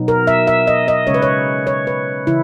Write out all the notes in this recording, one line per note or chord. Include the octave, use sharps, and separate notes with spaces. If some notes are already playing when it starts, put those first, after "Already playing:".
Already playing: B2 F#3 B3 D#4
A#4
E5
E5
D#5
D#5
C#3 G#3 C#4 C#5
B4
C#5
C#5
B4
C#3 E3 E4